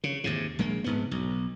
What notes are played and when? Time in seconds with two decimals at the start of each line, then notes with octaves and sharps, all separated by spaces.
0.04 C#3
0.24 D#2 G#2 C3
0.59 A#1 G#3 A#3
0.84 F1 G#2 B3
1.11 B1